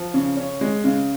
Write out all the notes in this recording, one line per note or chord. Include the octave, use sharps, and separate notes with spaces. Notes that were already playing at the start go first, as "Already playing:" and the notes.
Already playing: F3
C#3
C#4
G#3
C#3